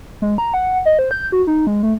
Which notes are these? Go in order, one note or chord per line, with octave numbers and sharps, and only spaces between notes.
G#3
A#5
F#5
D#5
C5
G6
F#4
D#4
G#3
A3